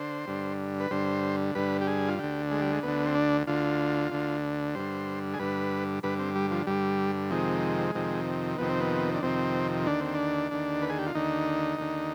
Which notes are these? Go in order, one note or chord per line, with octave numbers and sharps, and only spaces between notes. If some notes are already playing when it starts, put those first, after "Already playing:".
Already playing: D3 C5
G2 D3
B4
G2 D3 C5
G2 D3 B4
G4
G#4
F4
D2 D3 G4
G#3
G3
G#3
D2 D3 B3
C4
D4
D2 D3 F4
D2 D3
G2 D3 C5
G#4
G2 D3 B4
G2 D3 B4
C4
G3
F3
G2 D3 G3
F2 C3 D#3 G#3
F2 C3 D#3
F2 C3 D#3 B3
C4
B3
D4
F2 C3 D#3 C4
D#2 D3 D4
C4
D4
D#2 D3
B4
G#4
G4
F4
D#2 D3 D#4
D#2 D3